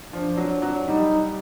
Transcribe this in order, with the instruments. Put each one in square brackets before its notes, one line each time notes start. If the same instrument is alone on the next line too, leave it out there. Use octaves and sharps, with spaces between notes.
[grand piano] F3 [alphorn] D4
[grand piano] F#3
F#3
[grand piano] G3 [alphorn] D#4